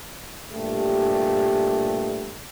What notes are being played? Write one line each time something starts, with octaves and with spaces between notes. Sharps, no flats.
G2 A#2 A3 G4